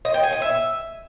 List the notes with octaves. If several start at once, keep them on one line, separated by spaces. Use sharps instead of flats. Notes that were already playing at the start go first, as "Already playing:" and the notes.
D#5
G5
G#5
D#5
E5